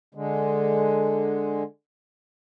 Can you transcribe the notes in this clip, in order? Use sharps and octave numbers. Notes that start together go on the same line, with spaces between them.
D3 G#3